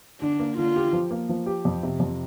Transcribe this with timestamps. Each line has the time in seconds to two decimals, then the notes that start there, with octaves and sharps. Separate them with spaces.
0.21 D3 D4
0.40 A#3
0.57 D3 F4
0.76 G4
0.93 F3
1.11 A#3
1.29 F3
1.46 G4
1.65 F2
1.83 C3
2.00 F2